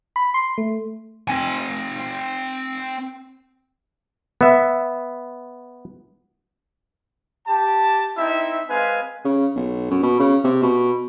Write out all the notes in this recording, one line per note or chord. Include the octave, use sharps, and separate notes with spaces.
B5
C6
A3
C4 G#5
B3 E5
G4 A5
C4 D#4 E4 E5
G#3 C4 B4 F5 G#5
C#3
B1
F#2
B2
C#3
C3
B2